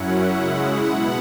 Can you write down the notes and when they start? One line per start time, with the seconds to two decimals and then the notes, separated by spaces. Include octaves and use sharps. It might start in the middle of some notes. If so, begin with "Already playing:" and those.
Already playing: F#2 F#3 C#4 E4 F#5
0.32 C#3 G#3 E4 F#5
0.83 B2 B3 E4